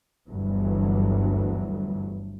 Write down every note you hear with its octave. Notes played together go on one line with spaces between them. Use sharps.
G1 D2 G2 E3 F#3